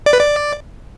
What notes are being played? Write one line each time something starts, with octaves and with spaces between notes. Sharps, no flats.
D5
B4
D5